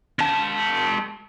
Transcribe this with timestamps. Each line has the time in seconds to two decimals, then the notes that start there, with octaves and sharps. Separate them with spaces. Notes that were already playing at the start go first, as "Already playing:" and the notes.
0.19 G#3 A5